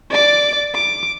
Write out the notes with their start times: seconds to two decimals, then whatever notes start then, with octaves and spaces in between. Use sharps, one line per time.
0.10 D5 D6
0.74 D6